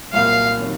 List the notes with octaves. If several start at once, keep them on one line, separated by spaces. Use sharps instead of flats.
C2 A#2 F#3 A#3 F5
C3 D#3 F#3